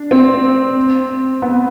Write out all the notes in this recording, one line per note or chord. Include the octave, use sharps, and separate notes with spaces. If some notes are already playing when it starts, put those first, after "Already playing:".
Already playing: D4
C4
B3